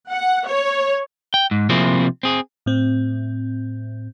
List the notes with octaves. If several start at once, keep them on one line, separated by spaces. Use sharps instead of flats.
F#5
C#5
G5
G#2
C3 F3 A#3 C4 E4 G#4
C4 G#4
A2 C4